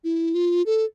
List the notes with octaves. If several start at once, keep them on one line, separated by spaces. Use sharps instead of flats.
E4
F4
A4